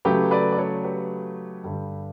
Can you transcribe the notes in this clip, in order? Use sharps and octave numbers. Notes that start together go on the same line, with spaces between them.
C#3 F#3 A3 G4 B4
B4 D5
D5
A4 C#5
G4 B4
G2 D3 G3